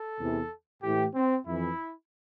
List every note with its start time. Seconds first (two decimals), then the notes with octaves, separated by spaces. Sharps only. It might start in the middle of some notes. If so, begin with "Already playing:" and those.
Already playing: A4
0.18 E2 C3 E3
0.83 A2 E3 G4
1.15 C4
1.47 F2 E3 E4